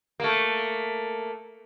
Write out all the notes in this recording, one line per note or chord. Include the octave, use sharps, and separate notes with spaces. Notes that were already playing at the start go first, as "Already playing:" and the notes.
A3 A#3